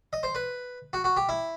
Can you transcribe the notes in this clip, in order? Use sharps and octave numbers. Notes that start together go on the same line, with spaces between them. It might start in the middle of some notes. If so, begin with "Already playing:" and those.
D#5
C5
B4
F#4
F#4
G4
E4